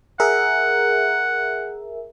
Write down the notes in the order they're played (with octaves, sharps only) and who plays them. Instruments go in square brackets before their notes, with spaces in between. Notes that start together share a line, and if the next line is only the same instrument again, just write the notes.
[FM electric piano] G#4 A#4 E5 [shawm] F#5